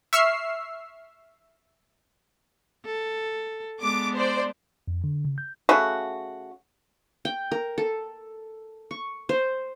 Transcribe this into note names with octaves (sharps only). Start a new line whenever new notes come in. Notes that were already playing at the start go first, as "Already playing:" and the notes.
E5 C#6 E6 F6 C7
A4
G#3 B3 D4 D6
C5 D5
F2
D3
C#3
G6
C#3 A3 F#4
G5
A#4
A4
C#6
C5